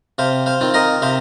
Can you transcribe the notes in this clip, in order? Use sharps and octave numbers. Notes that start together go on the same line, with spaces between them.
C3 C5 F5
C5 F5
D#3 C4 F4
A#4 D#5
C3 C5 F5